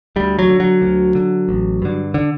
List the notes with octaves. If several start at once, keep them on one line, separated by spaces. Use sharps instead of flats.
D2 G3
F#3
D3
F#3
D2
D3
A1
G2 D3
D3